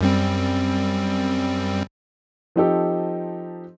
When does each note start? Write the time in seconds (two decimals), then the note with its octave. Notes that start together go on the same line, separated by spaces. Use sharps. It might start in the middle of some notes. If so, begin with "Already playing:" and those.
0.01 F#2 G3 C4
2.56 F3 C4 D#4 G4 A4